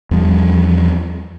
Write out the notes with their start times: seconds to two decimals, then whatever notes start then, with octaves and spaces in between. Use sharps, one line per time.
0.11 E2 F3 G3